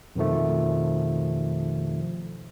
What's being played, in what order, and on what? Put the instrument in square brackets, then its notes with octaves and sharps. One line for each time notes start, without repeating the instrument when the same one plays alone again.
[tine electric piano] F2 B2 D#3 F3 A3